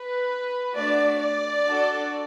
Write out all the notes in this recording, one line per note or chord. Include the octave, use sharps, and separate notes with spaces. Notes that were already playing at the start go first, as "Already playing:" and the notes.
Already playing: B4
A3 D4 F#4 D5
D5
D4 F#4 A4